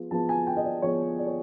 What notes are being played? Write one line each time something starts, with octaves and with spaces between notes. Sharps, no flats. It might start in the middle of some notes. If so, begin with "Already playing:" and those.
Already playing: F3 G#3 B3
F3 G#3 B3 A5
G#5
G5
D#5
D5
F3 G#3 B3 C#5
D5
C#5